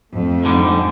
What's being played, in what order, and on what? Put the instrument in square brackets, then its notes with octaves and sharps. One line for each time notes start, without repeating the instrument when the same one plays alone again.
[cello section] F2 A3
[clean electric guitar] G#2 D3 G3